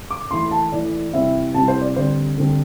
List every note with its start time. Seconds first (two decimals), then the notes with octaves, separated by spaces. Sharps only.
0.11 D6
0.31 E3 A3 E4 C6
0.51 A5
0.72 E3 A3 E4 D5
1.13 C3 G3 C4 E4 E5
1.54 C3 G3 C4 E4 A5
1.68 C5
1.82 D5
1.96 D3 G3 C4 C5
2.38 D3 G3 C4